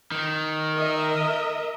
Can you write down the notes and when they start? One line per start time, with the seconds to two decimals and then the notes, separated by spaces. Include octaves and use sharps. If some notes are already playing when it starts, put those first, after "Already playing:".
0.12 D#3
0.74 A#4 D#5 E5